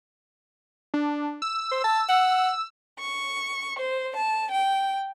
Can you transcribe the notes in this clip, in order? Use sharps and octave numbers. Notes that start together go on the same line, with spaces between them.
D4
E6
C5
A5
F#5
C#6
C5
A5
G5